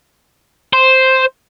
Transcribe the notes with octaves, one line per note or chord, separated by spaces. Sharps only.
C5